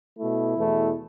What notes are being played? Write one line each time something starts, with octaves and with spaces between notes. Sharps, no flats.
B2 A3 E4
E2 B2 A3